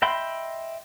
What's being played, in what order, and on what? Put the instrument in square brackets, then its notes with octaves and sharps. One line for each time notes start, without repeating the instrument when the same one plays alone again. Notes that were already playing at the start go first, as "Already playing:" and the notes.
[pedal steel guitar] D#5 E5 G5 B5 C6